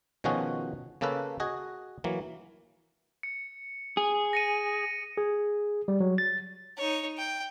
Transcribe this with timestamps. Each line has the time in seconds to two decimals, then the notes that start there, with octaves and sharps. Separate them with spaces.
0.24 B2 D#3 F3 C#4 F#4 G#4
1.01 C#3 A#3 C#4 A4 B4
1.40 F#4 G#4 D#5 G#5
2.04 E3 F#3 A#3
3.23 C#7
3.97 G#4
4.33 A#6 C#7 D#7
5.17 G#4
5.88 G3
6.00 F#3
6.18 A6
6.77 D#4 C#5
7.18 G5